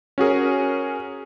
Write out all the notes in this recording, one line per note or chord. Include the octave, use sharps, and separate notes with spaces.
C#4 F#4 G#4 A#4